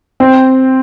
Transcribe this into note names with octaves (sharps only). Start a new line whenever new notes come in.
C4